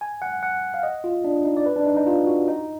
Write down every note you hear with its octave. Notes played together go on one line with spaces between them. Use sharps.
G#5
F#5
F#5
F5
D#5
F4
D4
D#4
D5
B4
D4
D#4
D#4
F4
F#4
D#4